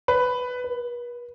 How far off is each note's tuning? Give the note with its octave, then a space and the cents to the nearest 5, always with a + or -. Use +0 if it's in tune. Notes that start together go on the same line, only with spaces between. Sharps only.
B4 +10
B4 -40